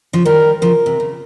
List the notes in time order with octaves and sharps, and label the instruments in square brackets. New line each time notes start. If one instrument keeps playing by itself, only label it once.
[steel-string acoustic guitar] C#3 F3
[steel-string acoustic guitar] D#3 G3 [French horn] A#4
[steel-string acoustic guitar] C#3 F3 [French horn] A#4
[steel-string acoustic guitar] C3
C#3